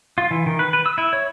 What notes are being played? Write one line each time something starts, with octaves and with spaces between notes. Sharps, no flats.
F4
E3
D#3
B4
B4
E6
E4
C#5